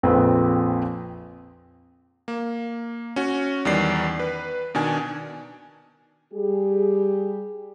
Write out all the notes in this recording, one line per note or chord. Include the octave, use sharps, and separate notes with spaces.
A#1 F2 C4 B4
A#3
C#4 F#4
E2 D#3 G3 D5 C7
B4
B2 D#3 D4 G#5
G3 G4 G#4